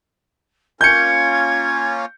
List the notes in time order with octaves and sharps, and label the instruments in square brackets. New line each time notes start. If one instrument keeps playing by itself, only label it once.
[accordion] A#3 C#4 F4 [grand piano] G6 C#7 [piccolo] G#6